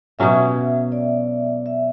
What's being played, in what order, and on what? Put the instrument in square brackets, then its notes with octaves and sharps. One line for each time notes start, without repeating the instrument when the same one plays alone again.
[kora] B2 F#3 C#4 [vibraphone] E5
[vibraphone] D5
E5